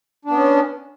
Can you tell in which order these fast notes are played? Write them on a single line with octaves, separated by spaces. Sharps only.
D4 B3 C#4